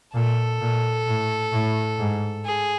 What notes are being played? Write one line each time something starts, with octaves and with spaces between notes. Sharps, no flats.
A#2 A4
A#2
A2
A2
G#2
G#4